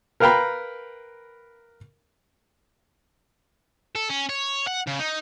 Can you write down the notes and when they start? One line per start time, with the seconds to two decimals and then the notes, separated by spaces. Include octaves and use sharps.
0.20 A#4 B4 F5 G5 A#5 B5
3.95 A4
4.10 C#4
4.29 C#5
4.67 F#5
4.87 C#3
4.99 D#4